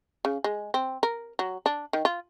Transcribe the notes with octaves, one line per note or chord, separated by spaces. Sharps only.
C#3
G#3
C4
A#4
F#3
D4
D#3
F4